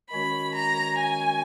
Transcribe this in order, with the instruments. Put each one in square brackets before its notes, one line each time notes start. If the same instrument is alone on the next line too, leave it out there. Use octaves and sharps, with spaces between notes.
[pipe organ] D#3 G#3 C#4 F#4 C#5 [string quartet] B5
[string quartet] A#5
G#5